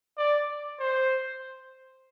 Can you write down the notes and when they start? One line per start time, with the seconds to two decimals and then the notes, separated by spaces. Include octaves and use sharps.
0.18 D5
0.80 C5